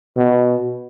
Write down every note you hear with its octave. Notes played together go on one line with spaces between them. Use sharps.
B2